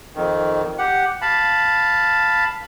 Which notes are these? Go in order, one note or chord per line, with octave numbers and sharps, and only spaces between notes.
F2 D#3
G4 F#5
F5 A5 B5